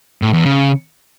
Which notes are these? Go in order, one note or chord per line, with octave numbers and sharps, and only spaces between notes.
A2
E2
C#3